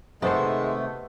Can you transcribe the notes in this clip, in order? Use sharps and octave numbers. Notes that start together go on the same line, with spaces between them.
C3 D#3 G#3 A3 B3 A4 C5